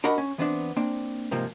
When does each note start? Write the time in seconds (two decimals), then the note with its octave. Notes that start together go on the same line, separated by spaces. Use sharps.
0.04 D4 F#4 A#4 D#5 F#5 B5
0.18 C#4
0.38 E3 B3 C4 D4
0.76 A#3 C4 D4
1.31 G#2 C3 F3 A#3